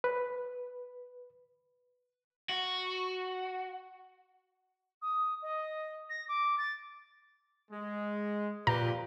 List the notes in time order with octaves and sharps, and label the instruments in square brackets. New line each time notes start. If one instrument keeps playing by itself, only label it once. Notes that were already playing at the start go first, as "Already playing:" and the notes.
[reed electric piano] B4
[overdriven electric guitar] F#4
[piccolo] D#6
D#5
A#6
D6
A6
[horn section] G#3
[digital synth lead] A#2 [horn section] F3 G4 B4 [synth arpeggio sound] A#5